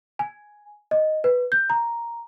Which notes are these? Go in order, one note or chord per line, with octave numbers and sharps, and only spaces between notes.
G#5
D#5
B4
G6
A#5